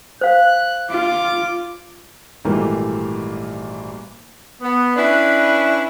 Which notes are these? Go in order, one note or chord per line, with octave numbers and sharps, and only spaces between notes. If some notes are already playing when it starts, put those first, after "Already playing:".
C5 F5 F#6
F4 D6
G#1 A#2 E3 G3 A3 A#3
B3
C#4 D4 E4 B4